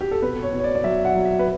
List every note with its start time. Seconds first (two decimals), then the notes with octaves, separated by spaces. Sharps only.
0.01 G4
0.11 A4
0.22 B2 B4
0.43 C#5
0.53 B2
0.59 C#5
0.64 D5
0.75 D5
0.84 F#3 E5
1.05 F#5
1.14 F#3
1.25 E5
1.39 B4